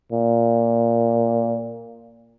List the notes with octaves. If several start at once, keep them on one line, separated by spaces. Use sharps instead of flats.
A#2